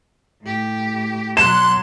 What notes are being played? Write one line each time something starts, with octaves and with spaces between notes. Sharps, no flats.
A2 G4
B2 F#3 C6 F#6 E7